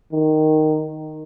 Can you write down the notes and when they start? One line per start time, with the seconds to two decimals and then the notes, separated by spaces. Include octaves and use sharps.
0.12 D#3